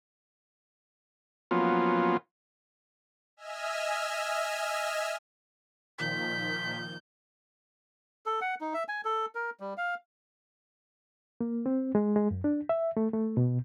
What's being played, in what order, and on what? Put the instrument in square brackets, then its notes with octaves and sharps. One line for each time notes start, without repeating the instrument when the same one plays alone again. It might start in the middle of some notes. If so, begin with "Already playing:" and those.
[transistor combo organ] F3 F#3 A#3 B3 C#4 F4
[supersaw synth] D#5 E5 G#5 E6 F6
[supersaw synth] A#2 D#3 F3 [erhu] G6 [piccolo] B6
[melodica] A4
F#5
D#4
E5
G#5
A4
A#4
G3
F5
[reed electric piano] A#3
C4
G#3
G#3
F#2
D4
E5
A3
A3
B2